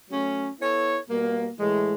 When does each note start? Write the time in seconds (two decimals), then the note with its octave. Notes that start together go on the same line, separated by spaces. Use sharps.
0.09 F#3 A3 C#4
0.58 B3 E4 A4 C#5
1.09 B2 G3 A#3
1.59 A2 E3 G#3